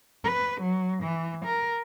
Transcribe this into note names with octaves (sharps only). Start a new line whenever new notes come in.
B4
F#3
E3
A#4